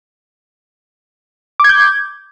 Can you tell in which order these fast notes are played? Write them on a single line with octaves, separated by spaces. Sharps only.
D6 G#6 G6